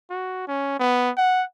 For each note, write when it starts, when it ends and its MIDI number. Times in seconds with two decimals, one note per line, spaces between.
0.10 0.44 66
0.48 0.78 61
0.79 1.10 59
1.17 1.44 78